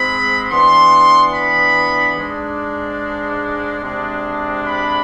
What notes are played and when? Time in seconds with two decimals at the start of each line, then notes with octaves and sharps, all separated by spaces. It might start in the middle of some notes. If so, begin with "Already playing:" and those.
Already playing: G#2 G#3 C4 B5
0.51 E3 B3 D4 C6
1.34 B5
2.16 G#2 G#3 D4
3.82 C3 G#3 D4
4.65 B5